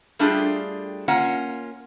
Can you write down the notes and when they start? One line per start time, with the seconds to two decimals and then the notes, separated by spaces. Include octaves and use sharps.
0.19 G3 A3 D4 F4 G4 G#4
1.08 A#3 C#4 F4 F#5